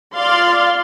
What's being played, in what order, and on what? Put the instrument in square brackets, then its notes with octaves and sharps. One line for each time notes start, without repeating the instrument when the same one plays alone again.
[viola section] F4 D5 F5 C6